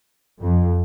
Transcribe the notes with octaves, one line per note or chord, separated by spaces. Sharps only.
F2